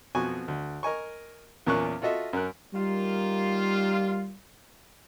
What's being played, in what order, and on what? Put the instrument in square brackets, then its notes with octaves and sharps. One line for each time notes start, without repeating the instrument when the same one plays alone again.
[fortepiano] F2 B2 F#4 G#5 C#6
D2
A#4 D#5 G#5 C#6
E2 A#2 A#3 C#4 C#6 F#6
F4 F#4 A4 D#5 E5
F#2 A#4 F#6
[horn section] D#3 A#3 F4 [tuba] G3